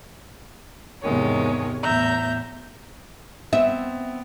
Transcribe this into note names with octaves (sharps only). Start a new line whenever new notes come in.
E2 G#2 C3 D#3 G#3 C#5
E2 A2 E5 A#5 G6
B3 C4 E5